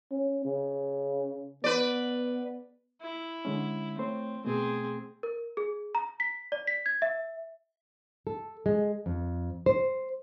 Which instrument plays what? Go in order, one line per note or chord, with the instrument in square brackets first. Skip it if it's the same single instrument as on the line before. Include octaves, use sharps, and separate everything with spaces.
[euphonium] C#4
C#3
[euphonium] B3 [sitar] B4 D5
[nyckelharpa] E4
[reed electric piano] D3 G#3 C#4
[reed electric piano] A3 C5 C#5 [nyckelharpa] C4
[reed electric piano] B2 A3 [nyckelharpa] C4 G#4
[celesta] A#4
G#4
A#5
B6
D5
B6
G#6
E5
[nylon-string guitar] A4
G#3
F2
C5